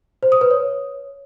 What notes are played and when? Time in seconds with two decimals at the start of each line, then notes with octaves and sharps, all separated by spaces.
0.23 C5
0.32 D#6
0.41 B4
0.51 C#5